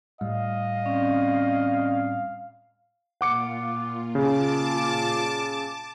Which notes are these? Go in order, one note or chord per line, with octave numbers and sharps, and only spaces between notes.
A2 G3 D#5 F5
C4 C#4 D5
A#2 F4 F#5 D6 C#7
C#3 A5 D6